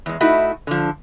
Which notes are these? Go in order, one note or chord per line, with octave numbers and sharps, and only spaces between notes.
E2 G#3
A3 D#4 E4 F#4
D3 F3